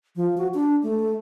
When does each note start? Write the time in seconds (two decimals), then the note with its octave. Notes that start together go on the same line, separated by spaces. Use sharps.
0.16 F3
0.38 F#4
0.54 D4
0.83 A3